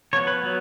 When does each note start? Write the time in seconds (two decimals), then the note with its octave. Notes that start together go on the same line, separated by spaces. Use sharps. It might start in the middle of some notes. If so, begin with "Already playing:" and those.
0.13 F3 B3 C#5
0.27 B4
0.43 F#3 B3